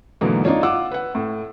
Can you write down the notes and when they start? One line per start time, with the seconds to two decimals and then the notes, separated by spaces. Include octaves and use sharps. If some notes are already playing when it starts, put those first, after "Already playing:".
0.21 G#2 B2 D3 E3 F#3 A#3
0.45 D4 D#4 F4 C#5
0.63 F4 F#5 D6 E6
0.91 B4 F#5
1.15 A2